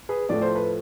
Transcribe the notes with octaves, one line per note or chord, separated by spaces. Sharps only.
G#4 B4
A2 F3 A3 D5
C5
B4